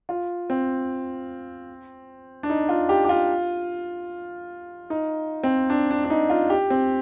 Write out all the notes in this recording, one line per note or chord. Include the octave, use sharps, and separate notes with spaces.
F4
C4
D4
D#4
F4
G4
G4
F4
D#4
C4
D4
D4
D4
D#4
F4
G4
C4